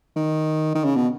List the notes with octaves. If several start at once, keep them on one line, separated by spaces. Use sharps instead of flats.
D#3
D#3
C#3
B2